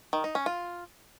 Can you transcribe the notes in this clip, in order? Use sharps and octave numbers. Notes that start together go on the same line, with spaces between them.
D#3
D#4
C#4
F4